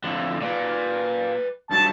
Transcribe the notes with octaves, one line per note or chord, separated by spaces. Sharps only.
F2 A2 D3
A#2 B4 D5
G2 F#3 A3 A5